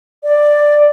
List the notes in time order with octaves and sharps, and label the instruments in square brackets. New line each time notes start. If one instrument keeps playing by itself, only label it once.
[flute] D5